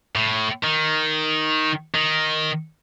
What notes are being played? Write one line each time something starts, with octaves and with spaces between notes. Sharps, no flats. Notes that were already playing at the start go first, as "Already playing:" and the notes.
A2
D#3
D#3